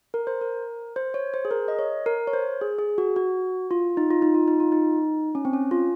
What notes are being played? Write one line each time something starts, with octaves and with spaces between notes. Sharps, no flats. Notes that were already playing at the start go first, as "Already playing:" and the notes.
A#4
C5
A#4
C5
C#5
C5
G#4
A#4
D#5
C#5
A#4
C#5
C5
G#4
G#4
F#4
F#4
F4
D#4
F4
D#4
F4
D#4
F4
D#4
C#4
C4
C#4
F4